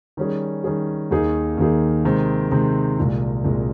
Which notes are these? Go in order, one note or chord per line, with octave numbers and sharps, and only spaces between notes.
D#3 G3 C#4 G#4
D#3 G3 C#4 G#4
D#2 D#3 A#3 D#4 G#4
D#2 D#3 A#3 D#4 G#4
C3 D#3 G#3 C4
C3 D#3 G#3 C4
C2 A#2 G#3
C2 A#2 G#3